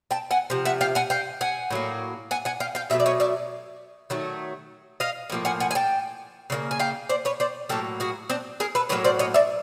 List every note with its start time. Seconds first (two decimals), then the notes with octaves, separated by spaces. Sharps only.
0.11 G5 A5
0.31 F#5 G#5
0.50 C3 F3
0.65 E5 F#5
0.81 F5 G5
0.95 F#5 G#5
1.10 F5 G5
1.41 F#5 G#5
1.71 A2 F#3 A#3
2.31 F#5 G#5
2.45 F#5 G#5
2.60 F5 G5
2.75 F5 G5
2.90 B2 F#3 A3 E5
3.00 D5
3.06 C#5 D#5
3.20 D5 E5
4.10 D#3 F#3 A3
5.00 D#5 F5
5.30 A2 F3 A#3
5.45 F#5 G#5
5.60 F#5 G#5
5.71 G#5
5.75 G5 A5
6.50 C#3 F#3 A#3
6.71 G#5
6.80 F5 G5
7.09 C5 D5
7.25 B4 C#5
7.40 C5 D5
7.69 A2 F#3 A#3 G4 A4
8.00 F#4 G#4
8.30 C4 D4
8.60 G#4 A#4
8.75 A4 B4
8.89 A2 F#3 A#3 B4 C#5
9.04 C5 D5
9.19 C#5 D#5
9.34 D5 E5